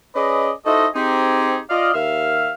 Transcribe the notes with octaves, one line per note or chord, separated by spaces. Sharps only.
C#4 G#4 B4 D5 D#5
D#4 E4 F#4 A4 C5 D#5
C4 D#4 G4 G#4
F4 D5 D#5 F5
D#2 E5 F5